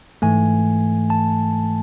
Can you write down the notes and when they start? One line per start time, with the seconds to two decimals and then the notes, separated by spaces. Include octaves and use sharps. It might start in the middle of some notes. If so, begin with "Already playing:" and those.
0.22 G#2 E3 A3 G#5
1.10 A5